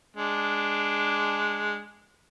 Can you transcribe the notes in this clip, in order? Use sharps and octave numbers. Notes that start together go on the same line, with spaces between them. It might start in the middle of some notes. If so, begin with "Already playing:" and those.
G#3 D4